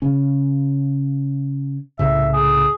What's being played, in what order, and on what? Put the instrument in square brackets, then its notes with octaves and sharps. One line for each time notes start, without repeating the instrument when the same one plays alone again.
[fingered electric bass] C#3 C#4
[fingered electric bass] C2 A2 C#3 [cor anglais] E5
[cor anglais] G#4